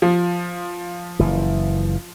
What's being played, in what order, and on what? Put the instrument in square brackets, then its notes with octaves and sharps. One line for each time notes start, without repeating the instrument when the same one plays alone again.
[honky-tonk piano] F3
[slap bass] F#1 E3